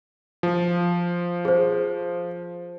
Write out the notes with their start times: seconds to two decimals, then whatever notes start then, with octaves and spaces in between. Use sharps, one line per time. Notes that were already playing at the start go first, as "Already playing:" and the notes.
0.43 F3
1.45 G#4 C5